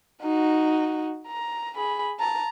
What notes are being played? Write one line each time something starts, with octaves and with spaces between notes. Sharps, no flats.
D#4 F#4
A#5
G#4 B5
A5 A#5